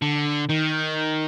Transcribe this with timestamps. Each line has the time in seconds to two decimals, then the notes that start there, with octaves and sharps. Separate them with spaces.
0.02 D3
0.49 D#3